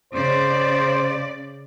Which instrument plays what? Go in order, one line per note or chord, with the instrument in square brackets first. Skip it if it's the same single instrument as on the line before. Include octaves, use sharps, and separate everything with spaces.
[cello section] C#3 D5 [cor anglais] C5